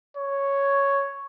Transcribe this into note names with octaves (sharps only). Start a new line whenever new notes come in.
C#5